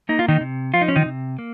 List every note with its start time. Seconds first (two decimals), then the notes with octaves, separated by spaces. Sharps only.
0.09 A#3 D#4
0.19 F4
0.28 D#3 D#4
0.41 C3
0.74 F3 F4
0.81 D#4
0.88 C#4
0.96 D#3 D#4
1.06 C3
1.39 A#3